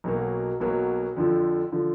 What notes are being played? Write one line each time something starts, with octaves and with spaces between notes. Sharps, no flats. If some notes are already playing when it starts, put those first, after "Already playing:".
B1 B2 F#3 A#3
B1 B2 F#3 A#3
F2 D3 F3
D3 F3